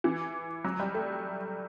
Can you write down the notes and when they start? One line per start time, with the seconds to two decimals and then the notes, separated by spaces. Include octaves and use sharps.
0.04 E3
0.65 F#3
0.80 G3
0.94 A3